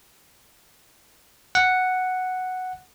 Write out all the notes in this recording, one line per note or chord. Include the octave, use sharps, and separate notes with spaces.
F#5